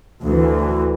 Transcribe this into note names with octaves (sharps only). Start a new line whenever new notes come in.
D2 E3